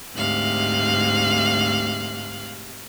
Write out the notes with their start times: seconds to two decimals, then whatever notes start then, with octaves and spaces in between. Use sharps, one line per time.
0.15 D2 G#2 C3 F5 F#6